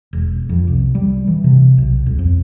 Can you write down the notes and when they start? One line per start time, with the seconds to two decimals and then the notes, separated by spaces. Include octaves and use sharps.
0.13 E1
0.49 F2
0.67 C2
0.95 G3
1.27 E3
1.44 C3
1.78 B1
2.06 C#2
2.19 F2